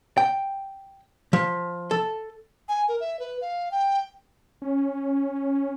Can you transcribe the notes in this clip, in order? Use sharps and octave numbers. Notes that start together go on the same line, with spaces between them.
G5
F3
A4
G#5
A#4
E5
B4
F5
G5
C#4